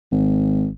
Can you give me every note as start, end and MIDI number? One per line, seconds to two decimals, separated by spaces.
0.11 0.69 32